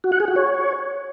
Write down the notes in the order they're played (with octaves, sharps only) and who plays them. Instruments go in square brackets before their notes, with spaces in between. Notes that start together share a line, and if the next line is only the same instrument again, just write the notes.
[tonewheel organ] F#4
F#5
G#4
F#4
C#5